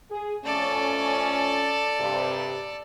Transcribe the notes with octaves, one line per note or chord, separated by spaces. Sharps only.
G#4
F2 A3 C#4 A4 D5
G2 C3